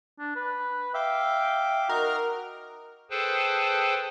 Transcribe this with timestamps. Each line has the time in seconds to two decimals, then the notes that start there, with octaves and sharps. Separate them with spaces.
0.19 D4
0.36 B4
0.94 E5 F5 G5 D6
1.89 D#4 F#4 A#4
3.10 G#4 A4 B4 C5 G5 A5